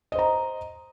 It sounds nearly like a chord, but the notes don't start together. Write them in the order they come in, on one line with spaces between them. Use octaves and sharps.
D#5 C5 A#5